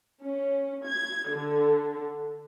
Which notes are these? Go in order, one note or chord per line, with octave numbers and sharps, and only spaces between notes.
C#4
G#6
D3